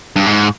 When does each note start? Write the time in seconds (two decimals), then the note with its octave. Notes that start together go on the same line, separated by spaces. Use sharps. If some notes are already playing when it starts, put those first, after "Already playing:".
0.16 G2
0.26 G#2